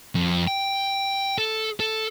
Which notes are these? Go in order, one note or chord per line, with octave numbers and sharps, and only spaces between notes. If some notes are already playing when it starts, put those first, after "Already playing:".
F2
G5
A4
A4